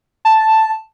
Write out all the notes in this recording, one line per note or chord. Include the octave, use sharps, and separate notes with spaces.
A5